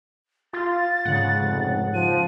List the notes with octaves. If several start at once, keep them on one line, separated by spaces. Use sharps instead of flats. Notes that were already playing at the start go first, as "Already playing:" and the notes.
F4 A6
G#2 C#3 F#5
F1
F3 D#7